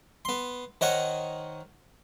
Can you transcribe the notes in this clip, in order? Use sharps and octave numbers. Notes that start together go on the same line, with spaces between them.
B3 C6
D#3 C5 C#5 D#5 F#5 C#6